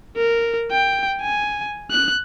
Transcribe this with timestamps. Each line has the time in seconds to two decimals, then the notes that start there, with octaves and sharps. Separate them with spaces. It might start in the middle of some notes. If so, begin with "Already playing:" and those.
0.16 A#4
0.71 G5
1.21 G#5
1.91 F#6